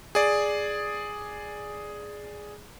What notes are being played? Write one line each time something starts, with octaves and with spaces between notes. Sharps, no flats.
G#4 D5